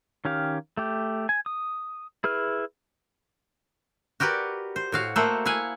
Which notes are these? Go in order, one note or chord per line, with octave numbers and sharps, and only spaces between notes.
D#3 C#4 G4 F5
A3 G4
G#5
D#6
E4 G#4 B4 F6
F#4 G4 A#4 B4 D5
C5
A2 F#4 F5
A3 A#3 A4 C5 E5 F#5
E4 F5 F#5 G#5